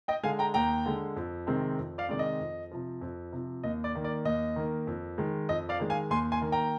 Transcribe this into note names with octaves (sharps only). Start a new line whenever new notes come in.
D#5 G5
D3 G#3 F5 G#5
G5 A#5
D#2 G5 A#5
D3 G#3
F2
C3 D#3 G#3 C4
F2
D5 F5
C3 D#3 G#3 C4 D5
D#5
F2
C3 F3
F2
C3 F3
D#2 D#5
D5
D#3 A#3
D5
D#2 D#5
D#3 A#3
F2
D#3 G#3
F2 D#5
D5 F5
D#3 G#3
F5 G#5
D#2 G#5 C6
G#5 C6
D#3 A#3
G5 A#5